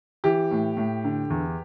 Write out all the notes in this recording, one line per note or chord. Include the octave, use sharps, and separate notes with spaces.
E3 G4
A2
A2
D3
E2